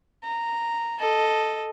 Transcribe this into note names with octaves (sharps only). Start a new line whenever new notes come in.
A#5
A4 D#5